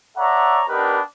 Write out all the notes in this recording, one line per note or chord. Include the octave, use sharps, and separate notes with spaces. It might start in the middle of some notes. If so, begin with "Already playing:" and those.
A4 C#5 D5 E5 F#5 A#5
B3 D4 D#4 G4 A#4 B4